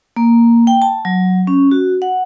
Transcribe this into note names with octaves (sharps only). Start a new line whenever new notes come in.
A#3
G5
A5
F#3
C#4
F#4
F#5